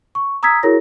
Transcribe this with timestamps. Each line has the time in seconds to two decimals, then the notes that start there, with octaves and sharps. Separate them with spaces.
0.15 C#6
0.43 A#5 D#6 E6 G#6 B6
0.63 E4 F#4 G#4 A#4 C#5 A#6